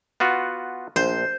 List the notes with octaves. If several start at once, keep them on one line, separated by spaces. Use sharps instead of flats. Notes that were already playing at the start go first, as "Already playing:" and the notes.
B3 F4 F#4
A#1 C5